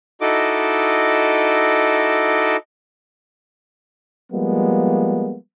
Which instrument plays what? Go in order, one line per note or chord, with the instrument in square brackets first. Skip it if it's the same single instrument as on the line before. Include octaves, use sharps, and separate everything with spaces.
[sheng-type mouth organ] D#4 E4 F#4 A4 D#5 D6
[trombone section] F3 G3 G#3 A#3 B3